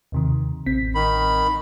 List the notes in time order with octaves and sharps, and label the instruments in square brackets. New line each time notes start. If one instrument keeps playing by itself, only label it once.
[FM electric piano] D#2 C3 D#3
A1 C4 B6
[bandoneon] D#3 B5